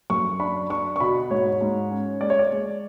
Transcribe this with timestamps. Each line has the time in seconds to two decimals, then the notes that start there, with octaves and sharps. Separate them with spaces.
0.10 F#2 C#6
0.40 D4 B5
0.70 D4 C#6
0.96 C#6
1.00 B2 B5
1.30 G#2 C#5
1.61 G#2
1.91 C#4
2.21 G#3 D5
2.30 C#5
2.39 D5
2.52 G#3